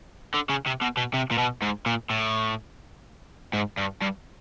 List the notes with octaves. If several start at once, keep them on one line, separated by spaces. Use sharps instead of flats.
D3
C#3
C3
B2
B2
C3
A#2
B2
G#2
A#2
A2
G#2
G2
G2